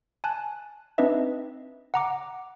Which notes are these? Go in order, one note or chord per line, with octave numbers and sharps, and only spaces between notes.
G#5 A5 F#6
C4 D4 D#4 B4 D#5 E5
F#5 A#5 D6